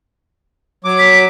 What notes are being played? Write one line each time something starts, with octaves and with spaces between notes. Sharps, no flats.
F#3 D6
B6